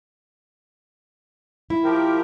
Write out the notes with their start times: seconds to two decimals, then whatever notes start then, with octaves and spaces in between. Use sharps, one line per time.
1.70 E4
1.84 F3 G4 A#4